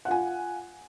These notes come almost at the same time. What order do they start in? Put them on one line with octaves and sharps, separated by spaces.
F#5 F4 G#5